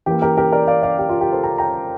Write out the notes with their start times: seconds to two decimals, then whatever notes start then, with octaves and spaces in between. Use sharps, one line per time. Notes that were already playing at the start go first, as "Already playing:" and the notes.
0.06 E3 A#3 G4
0.22 G4 A#4
0.37 G4 A#4
0.52 A#4 D5
0.67 D5 F5
0.83 D5 F5
0.99 G4
1.09 F4
1.21 G4
1.32 A4 C5
1.43 G5 A#5
1.58 G5 A#5